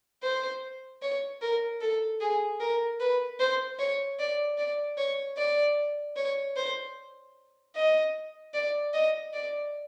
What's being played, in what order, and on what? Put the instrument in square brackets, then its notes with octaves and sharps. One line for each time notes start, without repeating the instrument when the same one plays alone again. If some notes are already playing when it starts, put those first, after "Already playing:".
[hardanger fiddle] C5
C#5
A#4
A4
G#4
A#4
B4
C5
C#5
D5
D5
C#5
D5
C#5
C5
D#5
D5
D#5
D5